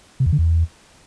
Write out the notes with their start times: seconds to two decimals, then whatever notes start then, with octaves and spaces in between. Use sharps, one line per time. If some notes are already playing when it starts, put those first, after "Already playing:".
0.20 C3
0.26 E2
0.32 D3
0.39 E2